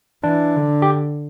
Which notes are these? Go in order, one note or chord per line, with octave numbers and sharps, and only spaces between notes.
E3 D4
D3
G4